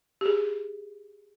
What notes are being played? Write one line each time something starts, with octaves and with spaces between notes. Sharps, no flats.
G4 G#4